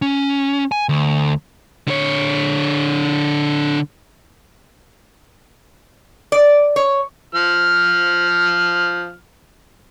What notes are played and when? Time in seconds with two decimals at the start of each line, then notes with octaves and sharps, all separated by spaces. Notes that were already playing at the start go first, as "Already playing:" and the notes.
0.02 C#4
0.72 G#5
0.89 D2
1.88 D3 C#5
6.32 D5
6.76 C#5
7.35 F3 F6